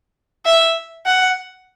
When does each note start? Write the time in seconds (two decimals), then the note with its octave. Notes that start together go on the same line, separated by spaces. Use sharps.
0.46 E5
1.07 F#5